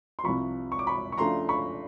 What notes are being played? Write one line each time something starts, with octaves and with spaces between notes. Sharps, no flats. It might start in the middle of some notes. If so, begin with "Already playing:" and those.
C6
C2 C3 F3 B5 C#6
C#6
D6
B5 C#6
C#6
C#3 F3 A3 D4 A#5 C6
B5 C#6